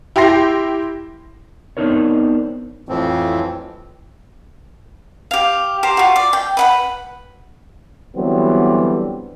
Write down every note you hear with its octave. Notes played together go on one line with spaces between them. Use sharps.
E4 G4 G5 C6 A#6 C7
B3 C4 D4 D#4 A#4 C#5
F2 A2 E3 F3 C4
G4 F5
G4 C5 A#5
F4 F#4
D5
G5
B4 F#5 B5
D3 E3 F#3 G3 B3 C4